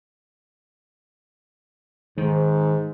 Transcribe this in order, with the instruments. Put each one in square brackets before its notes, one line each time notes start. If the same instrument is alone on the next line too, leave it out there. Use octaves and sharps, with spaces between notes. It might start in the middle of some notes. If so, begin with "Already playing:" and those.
[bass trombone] G#2 [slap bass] D#3